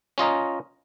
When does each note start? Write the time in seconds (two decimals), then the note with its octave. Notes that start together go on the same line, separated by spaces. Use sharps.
0.18 C#4 F4 D#5 A#5